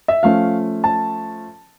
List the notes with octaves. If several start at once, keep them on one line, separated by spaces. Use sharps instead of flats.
E5
F3 A3 C#4 F5
A5